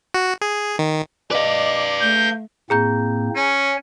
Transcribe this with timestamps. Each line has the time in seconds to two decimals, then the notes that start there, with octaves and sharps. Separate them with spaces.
0.14 F#4
0.41 G#4
0.79 D#3
1.31 B4 D5 D#5 F5
2.02 A3 G6
2.70 A2 A#3 C4 G#4 A#5 G6
3.36 C#4 C#5 G#5